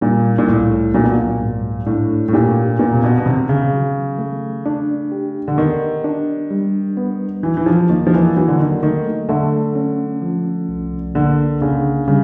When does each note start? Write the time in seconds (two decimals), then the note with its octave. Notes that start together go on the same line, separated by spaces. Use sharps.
0.01 A#2 G3
0.38 A#2
0.47 C2 A2
0.94 A#2 F#3
1.04 B2
1.13 A#2
1.41 G#2
1.86 A2 D4
2.28 A2
2.33 A#2 G4
2.79 A#2 B3
2.92 C3
3.04 B2
3.18 B2
3.26 C3 D#3
3.49 C#3
3.73 F#3
4.19 A3
4.66 D4
5.12 G4
5.48 D3
5.58 D#3 B3
6.04 D4
6.51 G3
6.97 B3
7.43 E3 F#3
7.57 E3
7.66 F3
7.89 D#3 A#3
8.07 F3
8.14 E3
8.36 E3 F#3
8.48 D3
8.60 D#3
8.83 D#3 A3
9.29 D3 A3
9.75 C#4
10.22 F3
10.69 C2
11.15 D3 A#3
11.61 C#3 D4
12.08 C#3 G3